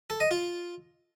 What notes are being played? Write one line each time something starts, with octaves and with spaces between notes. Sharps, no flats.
A4
D#5
F4